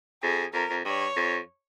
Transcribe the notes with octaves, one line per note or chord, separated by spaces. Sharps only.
F2 G#4
F2 A#4
F2
G2 C#5
F2